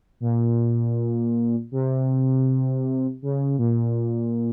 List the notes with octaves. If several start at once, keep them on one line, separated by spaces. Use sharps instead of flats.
A#2
C3
C#3
A#2